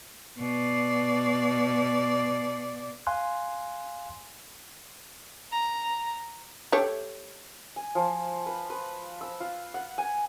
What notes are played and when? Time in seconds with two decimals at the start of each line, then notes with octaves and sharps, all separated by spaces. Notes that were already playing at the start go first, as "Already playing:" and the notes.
0.39 B2 D5
3.07 F5 G#5 C6 F#6
5.52 A#5
6.72 A3 G4 C#5
7.76 G#5
7.95 F3
8.46 B4
8.70 B4
9.21 E6
9.40 F4
9.74 F#5
9.98 G#5